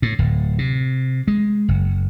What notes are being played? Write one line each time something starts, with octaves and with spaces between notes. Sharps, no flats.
A2
D1
C3
G#3
F#1